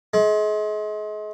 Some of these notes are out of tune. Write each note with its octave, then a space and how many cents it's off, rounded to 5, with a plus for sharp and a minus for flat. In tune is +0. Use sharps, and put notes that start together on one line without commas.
G#3 +35